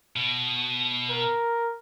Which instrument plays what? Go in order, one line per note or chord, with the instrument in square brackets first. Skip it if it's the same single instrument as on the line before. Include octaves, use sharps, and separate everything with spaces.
[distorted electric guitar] B2
[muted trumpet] A#4